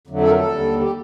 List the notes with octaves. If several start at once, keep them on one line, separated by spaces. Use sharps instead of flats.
F2 D3 F#3 A3
A4
A#4
A4
D#2 D3 G3
G4